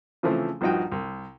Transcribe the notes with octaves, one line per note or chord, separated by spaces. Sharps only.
C#3 E3 F3 A3 C4
A#1 G2 F3 D#4 F#4 G5
C2